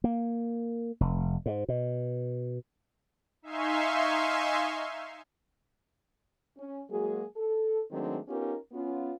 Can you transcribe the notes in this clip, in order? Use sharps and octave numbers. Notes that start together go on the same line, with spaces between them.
A#3
F1
G#2
B2
D#4 E5 F5 G#5 C6 C#6
C#4
F#3 G#3 A#3 F#4 G#4
A4
D#3 F#3 G#3 A3 C4 D4
B3 C#4 D#4 F4 G4 A#4
B3 C#4 F4